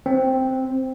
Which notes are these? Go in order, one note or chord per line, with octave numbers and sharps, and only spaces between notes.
C4